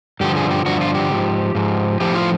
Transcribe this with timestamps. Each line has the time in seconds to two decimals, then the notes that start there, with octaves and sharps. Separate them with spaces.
0.20 G2 D3 F3 G4
0.36 G#4
0.51 G4
0.65 G2 D3 F3 F#4
0.81 F4
0.95 G4
1.11 G#2 F3
1.55 G#2 F3
2.00 A2 F3 G4
2.15 F4